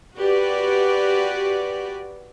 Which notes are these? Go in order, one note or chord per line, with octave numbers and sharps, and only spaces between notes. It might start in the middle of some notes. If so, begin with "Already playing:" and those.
F#4 G4 B4 D5